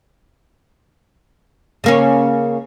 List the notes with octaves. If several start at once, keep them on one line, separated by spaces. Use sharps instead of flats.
C#3 A#3 C#4